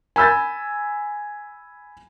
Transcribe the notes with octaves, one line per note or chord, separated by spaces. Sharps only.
G#5 B5 E6 G6 A6